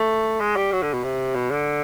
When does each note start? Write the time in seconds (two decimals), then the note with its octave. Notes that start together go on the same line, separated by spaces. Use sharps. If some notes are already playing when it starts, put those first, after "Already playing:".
Already playing: A3
0.40 G#3
0.56 G3
0.72 F#3
0.83 D3
0.93 B2
1.04 C3
1.35 B2
1.51 D3